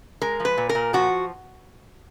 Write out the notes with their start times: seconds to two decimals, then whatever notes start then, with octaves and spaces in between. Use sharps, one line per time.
0.22 G#3 A#4
0.40 F3
0.45 B4
0.57 A#2
0.69 A#4
0.75 A#2
0.93 F3 F#4